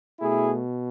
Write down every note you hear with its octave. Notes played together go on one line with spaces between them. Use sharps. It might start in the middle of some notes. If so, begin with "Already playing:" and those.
B2 A3 E4 G#4